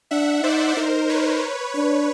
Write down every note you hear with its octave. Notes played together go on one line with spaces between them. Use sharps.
D4 E5 F#5
D#4 C5 D5
D#4 A#4 C5
B4 C#5
D4 B4 C#5